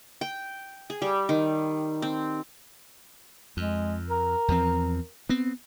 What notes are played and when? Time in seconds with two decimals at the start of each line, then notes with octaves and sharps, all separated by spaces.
0.21 G5
0.90 G#4
1.02 G3
1.29 D#3
2.02 C4
3.57 F2 G#3
4.10 A#4
4.48 E2 F3 C4
5.29 B3 C4